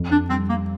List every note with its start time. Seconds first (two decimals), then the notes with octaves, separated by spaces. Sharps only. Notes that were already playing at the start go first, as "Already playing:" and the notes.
Already playing: F2
0.11 D4
0.30 G3 C4
0.49 A#3